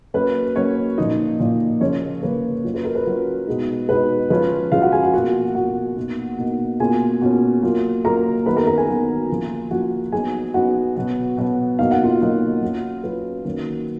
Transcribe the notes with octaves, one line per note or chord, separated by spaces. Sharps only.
F#3 A#3 C#4 B4
F#3 A#3 C#4 C#5
A#2 F3 A#3 D#4 D#5
A#2 F3 A#3 D#4
C#3 F3 A#3 C#4 C#5
C#3 F3 A#3 C#4 B4
F#3 C#4 F4
B4
A#4
B4
F#3 C#4 F4
B2 G#3 D#4
B2 G#3 D#4 B4
F3 G#3 C#4 F4 B4
F3 G#3 C#4 F4 F5
F#4 F#5
G#4 G#5
F#4 F#5
B2 A#3 F4 F#4 F#5
B2 A#3 F4 F#4 F#5
B2 A#3 D#4
B2 A#3 D#4
B2 A#3 C#4 F4 G#4 G#5
B2 A#3 C#4 F4
F#3 A#3 F4
F#3 A#3 F4 A#4 A#5
D#3 F#3 B3 B4 B5
A#4 A#5
A#4 A#5
G#4 G#5
D#3 F#3 B3
F3 A#3 F4
F3 A#3 F4 F#4 F#5
F#3 B3 D#4 G#4 G#5
F#3 B3 D#4 F#4 F#5
B2 F#3 B3
B2 F#3 B3
B2 F#3 A#3 D#4 F5
F#5
F4 F5
B2 F#3 A#3 D#4
F#3 C#4 F4
F#3 C#4 F4 B4
D#3 F#3 A#3 C#4